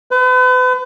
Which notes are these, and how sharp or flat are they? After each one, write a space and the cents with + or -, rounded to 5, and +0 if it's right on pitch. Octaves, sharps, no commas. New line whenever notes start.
B4 +40